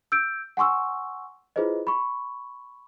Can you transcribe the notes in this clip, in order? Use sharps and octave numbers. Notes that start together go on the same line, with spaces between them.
E6 G6 D7
F#5 G#5 C6 C#6 E6
E4 F4 G#4 B4 C5 D#5
B5 C#6